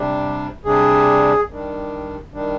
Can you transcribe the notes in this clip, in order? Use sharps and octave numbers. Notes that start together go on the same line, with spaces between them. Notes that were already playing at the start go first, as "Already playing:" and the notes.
Already playing: C3 G3 D4
C3 G3 D4 G#4
D#3 G3 D4
D#3 G3 D4